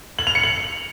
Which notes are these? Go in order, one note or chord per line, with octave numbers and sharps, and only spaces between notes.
F#7
F7
C#7
F#7